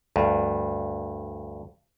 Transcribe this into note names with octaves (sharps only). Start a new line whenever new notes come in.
D2 G2